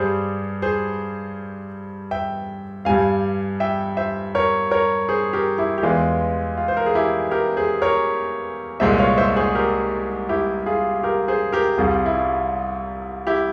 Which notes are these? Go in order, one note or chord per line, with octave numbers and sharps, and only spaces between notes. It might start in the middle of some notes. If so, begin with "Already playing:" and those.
Already playing: G2 G3 G#4 C5
G#4 C5
E5 G5
G2 G3 F5 G#5
E5 G5
C5 E5
A#4 C#5
A#4 C#5
G#4 C5
G4 A#4
E4 G4
G4
E2 E3 G#3 F4
F4
C5
A#4
G#4
E4 G4
G4 A#4
G#4 C5
A#4 C#5
C2 A#2 G#3 C5 E5
C#5 F5
C5 E5
G#4 C5
G4 A#4
E4 G4
F4 G#4
G4 A#4
G#4 C5
G4 A#4
C2 C3 G3 F4 G#4
E4
F4
E4 G4